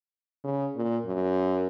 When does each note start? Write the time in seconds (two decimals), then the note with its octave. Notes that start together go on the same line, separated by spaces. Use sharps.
0.44 C#3
0.76 A#2
1.06 F#2